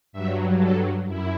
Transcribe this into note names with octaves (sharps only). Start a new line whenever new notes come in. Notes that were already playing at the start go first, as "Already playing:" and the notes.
G2 F#3 E5
A4
F#2 E4